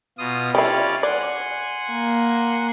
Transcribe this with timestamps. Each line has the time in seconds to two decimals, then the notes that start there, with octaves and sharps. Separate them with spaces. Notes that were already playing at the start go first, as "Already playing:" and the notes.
0.18 B2 F4 D#6
0.55 G3 C#4 E4 F4 D5
1.03 D5 F#5 G#5 C6
1.92 A#3